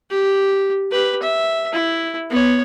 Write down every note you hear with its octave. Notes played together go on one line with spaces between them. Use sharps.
G4
G4 B4
E5
E4
B3 C#5